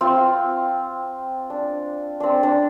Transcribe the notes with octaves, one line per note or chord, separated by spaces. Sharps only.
C4 F4
D4
C4 D4
D4